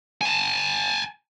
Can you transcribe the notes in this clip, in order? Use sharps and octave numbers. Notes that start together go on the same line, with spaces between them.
G#5 A5